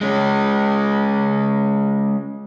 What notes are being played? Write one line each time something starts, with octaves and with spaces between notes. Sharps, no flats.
G#3 C#4